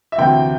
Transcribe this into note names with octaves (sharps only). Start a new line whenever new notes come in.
E5
D2 C3 E3 C4 E4 G5